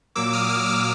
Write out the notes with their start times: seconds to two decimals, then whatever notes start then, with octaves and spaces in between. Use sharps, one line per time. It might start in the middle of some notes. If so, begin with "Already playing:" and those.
0.15 A#2 F#3 A#3 D6 E6
0.33 D#6 F6
0.49 D#6 F6
0.66 D6 E6